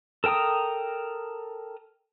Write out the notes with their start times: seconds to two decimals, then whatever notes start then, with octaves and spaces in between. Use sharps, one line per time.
0.24 A4 A#4 G5 A#5 D#6